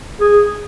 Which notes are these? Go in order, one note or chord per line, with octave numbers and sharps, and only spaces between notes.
G#4